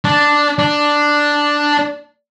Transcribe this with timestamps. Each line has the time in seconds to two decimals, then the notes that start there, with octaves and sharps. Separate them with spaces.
0.05 D4
0.59 D4